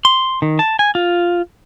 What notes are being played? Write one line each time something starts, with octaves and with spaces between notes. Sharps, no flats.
C6
D#3
A5
G#5
F4